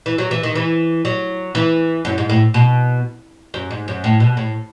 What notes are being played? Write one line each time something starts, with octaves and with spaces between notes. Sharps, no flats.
E3
F#3
E3
D#3
E3
F#3
E3
F#2
G#2
A2
B2
F#2
G#2
F#2
A2
B2
A2